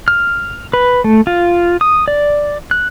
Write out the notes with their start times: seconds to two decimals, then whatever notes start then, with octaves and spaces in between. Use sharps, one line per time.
0.08 F6
0.73 B4
1.04 A3
1.27 F4
1.81 D#6
2.08 D5
2.71 F#6